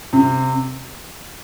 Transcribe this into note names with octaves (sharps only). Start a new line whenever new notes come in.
C3